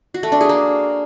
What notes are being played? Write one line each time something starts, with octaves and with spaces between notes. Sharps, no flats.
F#4
A3
D4
G#4
A#3